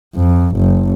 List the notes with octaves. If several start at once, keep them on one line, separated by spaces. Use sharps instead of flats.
F2
F#1